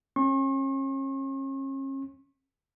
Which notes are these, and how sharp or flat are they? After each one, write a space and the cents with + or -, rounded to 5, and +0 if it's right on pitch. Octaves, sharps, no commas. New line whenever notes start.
C#4 -40 C#6 -45